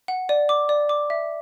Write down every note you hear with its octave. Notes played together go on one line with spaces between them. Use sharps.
F#5
D5
D6
D5
D6
E5